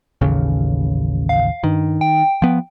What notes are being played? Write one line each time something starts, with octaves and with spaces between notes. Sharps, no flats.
A1 D#2 C#3
F5
G2 D#3
G5
F3 B3